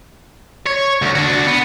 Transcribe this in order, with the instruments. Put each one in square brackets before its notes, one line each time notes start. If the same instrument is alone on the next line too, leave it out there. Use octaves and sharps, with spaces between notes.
[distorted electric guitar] C#5
D2
D4 F#4
B3